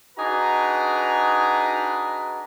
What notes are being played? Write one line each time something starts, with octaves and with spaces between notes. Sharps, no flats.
D4 D#4 F#4 G#4 B4 A#5